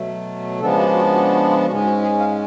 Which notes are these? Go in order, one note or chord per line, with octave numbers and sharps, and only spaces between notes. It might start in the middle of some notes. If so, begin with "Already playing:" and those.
Already playing: B2 F#3 A3
C#3 F3 G#3 B3 D4 A4
F#4
F#4
F#4
F#4
F4
G#2 G#3 C#4 F#4
F#4
G#4
F5